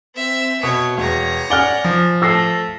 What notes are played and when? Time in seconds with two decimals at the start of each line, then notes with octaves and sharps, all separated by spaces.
0.15 C4 E5
0.63 B2 C#5
0.97 E1 C#5 A#5
1.50 D5 F#5 G#5 F6 G7
1.84 F3
2.22 A3 E6 A#6 C7